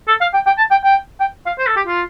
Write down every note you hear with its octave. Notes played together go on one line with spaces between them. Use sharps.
A4
F5
G5
G5
A5
G5
G5
G5
F5
C5
A4
G4
F4